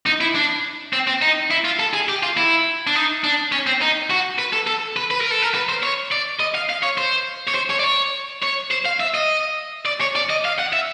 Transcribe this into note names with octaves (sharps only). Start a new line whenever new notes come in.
D#4
E4
D4
C4
C4
D#4
E4
F4
A4
G#4
G4
F4
E4
D4
D#4
D4
C#4
C4
D#4
F#4
B4
A4
A4
B4
B4
A#4
A4
A#4
B4
C5
C#5
D5
D#5
F5
F5
C#5
C5
C#5
C5
C#5
D5
C#5
C#5
C5
F5
E5
D#5
D5
C#5
D5
D#5
F5
F#5
E5